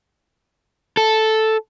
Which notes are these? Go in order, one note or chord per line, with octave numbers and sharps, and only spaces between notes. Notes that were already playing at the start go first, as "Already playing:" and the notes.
A4